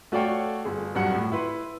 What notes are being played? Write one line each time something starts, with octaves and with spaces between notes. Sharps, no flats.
A3 F#4 C#5 D5 F5 G5
G1 G#4
D#1 G2 F#3 F#5
A2
E4 B4 C6